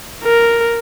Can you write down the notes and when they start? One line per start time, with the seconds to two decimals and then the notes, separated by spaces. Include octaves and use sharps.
0.24 A#4